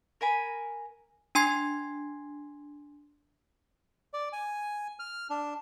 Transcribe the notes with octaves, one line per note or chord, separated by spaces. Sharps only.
A#4 G#5 B5
D4 G#5 C6 G#6 C7
D5
G#5
F6
D4